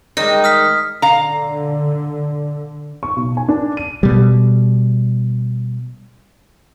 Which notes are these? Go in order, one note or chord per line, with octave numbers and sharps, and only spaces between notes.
D#3 G3 G#3 D#4 D#5
D#6 F6 B6
D3 F5 A#5
C#6
B1
G#5
D4
D#7
B2 G3